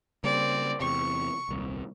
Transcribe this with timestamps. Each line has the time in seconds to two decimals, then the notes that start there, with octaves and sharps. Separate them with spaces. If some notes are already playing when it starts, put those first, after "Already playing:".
0.24 C#3 G3 A#3 C4 D5
0.80 E2 C3 C#6
1.49 D#1 C2